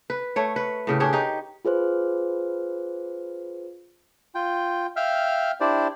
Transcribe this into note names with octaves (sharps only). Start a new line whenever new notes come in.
B4
A3 C#5
B4
A2 C#3 G4
D4 G4 G#4 C#5
D#4 G4
F4 G#4 B4 C5
F4 G5
E5 F5 G5 F6
D4 E4 G4 C5 D5